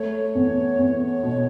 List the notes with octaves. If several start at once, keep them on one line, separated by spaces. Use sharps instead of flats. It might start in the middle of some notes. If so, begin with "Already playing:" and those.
Already playing: A3 C#5
E2
E2
B2